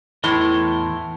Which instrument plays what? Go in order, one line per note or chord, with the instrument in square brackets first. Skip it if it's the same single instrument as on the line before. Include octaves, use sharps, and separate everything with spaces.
[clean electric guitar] E2 E3 C6 [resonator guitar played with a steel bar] A2